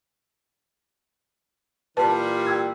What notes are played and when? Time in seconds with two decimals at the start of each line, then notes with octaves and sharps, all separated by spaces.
1.97 A#2 E3 G3 B4 A5
2.47 G5 E6 G#6